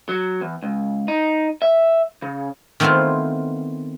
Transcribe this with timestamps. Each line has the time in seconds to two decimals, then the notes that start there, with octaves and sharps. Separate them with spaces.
0.09 F#3
0.41 E2
0.63 C#2
1.08 D#4
1.62 E5
2.22 C#3
2.80 D#3 A3 B3 C4 E4 F4